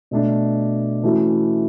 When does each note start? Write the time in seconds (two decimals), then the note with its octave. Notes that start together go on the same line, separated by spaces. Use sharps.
0.11 B2 A3 D4
1.03 E3 A3 C#4 F#4